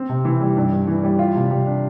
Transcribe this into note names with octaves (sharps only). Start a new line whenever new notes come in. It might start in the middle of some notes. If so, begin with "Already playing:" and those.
Already playing: C4
C3
E3
G3
G2
G2
E3
G3
F4
C3
G3
D4